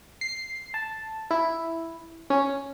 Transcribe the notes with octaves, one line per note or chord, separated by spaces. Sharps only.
C7
A5
E4
C#4